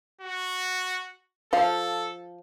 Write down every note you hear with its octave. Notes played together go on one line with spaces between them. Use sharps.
F#4
F3 A4 F5